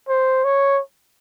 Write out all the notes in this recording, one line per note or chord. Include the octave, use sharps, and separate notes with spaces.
C5
C#5